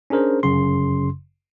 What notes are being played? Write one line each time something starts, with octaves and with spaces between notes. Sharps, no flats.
C#4 D4 G#4 A#4 C5
G1 F#2 C#3 C6